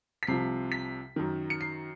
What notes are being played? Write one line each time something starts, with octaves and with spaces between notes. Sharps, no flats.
B6
C2 C3 F3 C7
B6
F#2 D#3
C#7
C7